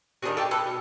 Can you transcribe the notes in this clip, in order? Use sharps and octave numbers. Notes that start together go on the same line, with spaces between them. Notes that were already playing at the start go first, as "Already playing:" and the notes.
D#3 G3 B3 D4 F#4 G#4
G4 A4
A4 B4
B2